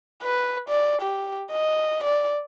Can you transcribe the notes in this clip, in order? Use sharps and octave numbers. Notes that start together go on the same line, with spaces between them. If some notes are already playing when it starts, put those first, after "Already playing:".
B4
D5
G4
D#5
D5